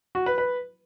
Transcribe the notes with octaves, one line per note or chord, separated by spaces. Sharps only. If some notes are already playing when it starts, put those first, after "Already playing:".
F#4
B4
B4